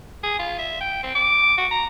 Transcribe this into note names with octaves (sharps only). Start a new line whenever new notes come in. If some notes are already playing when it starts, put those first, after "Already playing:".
G#4
F4
E5
G5
C4
D6
F#4
A#5